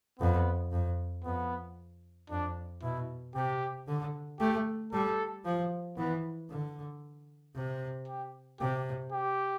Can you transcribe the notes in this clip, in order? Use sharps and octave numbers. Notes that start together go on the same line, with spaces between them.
F2 B3
F2
F2 B3
F2 D4
B2 E4
C3 G4
D3
A3 G4
G3 A4
F3
E3 B3
D3
C3
G4
C3 G4
G4